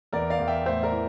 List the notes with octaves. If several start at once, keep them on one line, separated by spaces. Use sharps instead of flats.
E2 A#4 D5
D5 F5
E2
E5 G5
A2 C5 E5
A#4 D5
E3